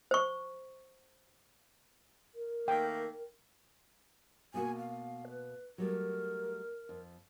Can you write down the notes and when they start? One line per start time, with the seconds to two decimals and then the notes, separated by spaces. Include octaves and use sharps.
0.11 C5 C#6
2.35 A#4
2.68 D#3 A3 A#3 G5
4.54 B2 A#3 F#4 G#5
4.78 F5
5.29 B4
5.78 F#3 G3 A3 A#4
6.89 F2